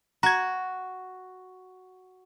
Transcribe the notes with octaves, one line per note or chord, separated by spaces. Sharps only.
F#4 A#5 G#6